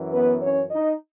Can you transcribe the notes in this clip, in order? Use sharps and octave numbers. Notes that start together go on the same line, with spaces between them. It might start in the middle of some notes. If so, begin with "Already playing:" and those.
Already playing: F#2 E3
B3 B4
C#4 C#5
D#4 D#5